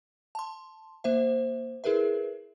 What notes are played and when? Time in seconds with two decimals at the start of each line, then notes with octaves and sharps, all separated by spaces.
0.35 A5 C6
1.04 A#3 C5 E5
1.84 E4 G#4 A#4 B4 E5